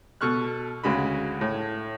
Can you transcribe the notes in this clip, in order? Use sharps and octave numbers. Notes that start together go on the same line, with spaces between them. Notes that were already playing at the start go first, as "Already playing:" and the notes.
B2 A4 C#6 F6 F#6
D2 C#3 G#3 F#4 B5
A2